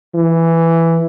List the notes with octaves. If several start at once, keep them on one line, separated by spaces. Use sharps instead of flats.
E3